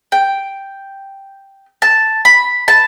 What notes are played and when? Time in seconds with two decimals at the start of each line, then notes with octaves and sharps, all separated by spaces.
0.12 G5
1.82 A5
2.25 B5
2.68 A5